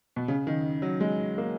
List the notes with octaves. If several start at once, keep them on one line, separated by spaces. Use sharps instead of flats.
B2
C#3
D#3
F#3
G#3
A#3